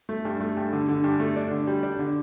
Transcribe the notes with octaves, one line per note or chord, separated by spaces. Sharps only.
A3
G2
A3
G2
D3
D3
G2
A3
D4
D3
G3
D4
D3